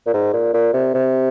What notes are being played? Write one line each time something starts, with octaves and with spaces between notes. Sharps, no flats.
A#2
G#2
A#2
A#2
C3
C3